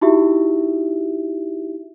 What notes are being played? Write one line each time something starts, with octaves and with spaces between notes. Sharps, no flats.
D#4 E4 F#4 G4 E5